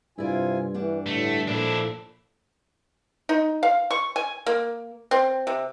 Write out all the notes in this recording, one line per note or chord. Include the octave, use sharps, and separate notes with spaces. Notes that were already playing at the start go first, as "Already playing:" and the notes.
G2 C3 E4 F4 D5 G#5
E3 G3 D4 F#5
A2 D3 A3
A#2 F3 A#3 D4 E4 A4
D#4
F5
C#6
G#5
A#3
C4
C3